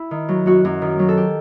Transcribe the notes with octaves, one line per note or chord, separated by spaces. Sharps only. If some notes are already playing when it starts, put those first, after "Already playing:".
Already playing: E4
D#3
F#3
F#2 F#4
F#2
D#3
F#3
A4
G4